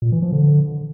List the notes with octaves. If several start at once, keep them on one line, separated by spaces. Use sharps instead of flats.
A#2
E3
F3
D3